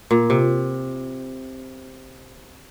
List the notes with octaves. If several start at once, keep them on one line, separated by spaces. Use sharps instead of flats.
A#2
C3